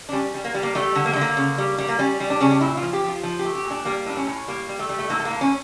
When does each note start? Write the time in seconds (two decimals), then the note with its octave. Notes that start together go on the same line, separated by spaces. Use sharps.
0.09 D4
0.12 G3 C#4
0.34 G3
0.45 A#3
0.54 G3
0.63 A#3
0.75 G3 A3
0.95 D3
1.06 A#3
1.13 A3
1.16 D3
1.21 A#3
1.37 C#3
1.58 G3
1.78 G3
1.89 A#3
1.99 G3 C#4
2.20 G3
2.30 D4
2.40 C#3 C#4
2.51 D4
2.61 A#2 E4
2.77 F4
2.82 F3
2.93 G4
3.04 F3 F4
3.23 F3
3.39 G4
3.45 A3
3.55 G4
3.65 A#2
3.70 D4
3.85 G3 A#3
4.06 A2 D4
4.17 C#4
4.27 A2
4.48 G3 A#3
4.69 G3
4.79 A3
4.89 G3
4.99 A3
5.10 A2 A#3
5.20 A3
5.25 A#3
5.30 A2
5.41 C#4